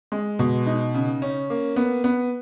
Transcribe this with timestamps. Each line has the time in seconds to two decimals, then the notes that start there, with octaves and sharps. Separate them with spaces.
0.12 G#3
0.39 B2
0.66 D#4
0.94 C#3
1.22 C#4
1.50 A#3
1.76 B3
2.04 B3